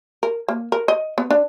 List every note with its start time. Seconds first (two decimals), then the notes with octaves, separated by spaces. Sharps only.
0.23 A#4
0.48 A#3
0.72 A#4
0.88 D#5
1.18 B3
1.30 D4